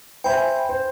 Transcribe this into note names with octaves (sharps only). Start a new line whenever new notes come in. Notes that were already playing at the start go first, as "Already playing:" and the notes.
C5 E5 G5 G#5 B5
C5